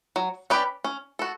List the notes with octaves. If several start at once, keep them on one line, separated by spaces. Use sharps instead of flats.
F#3
C#4 G4 B4 D5
C#4
F#4 A4